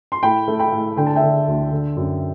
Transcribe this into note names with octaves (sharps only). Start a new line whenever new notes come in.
C6
A2 G5 B5
A3
G5 B5
A2
D3 G5
A5
E5 G5
D3
D2
D3
F#2